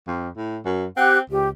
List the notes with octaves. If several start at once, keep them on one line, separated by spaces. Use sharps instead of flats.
F2
A2
F#2
C4 G4 F#5 F#6
C#2 G4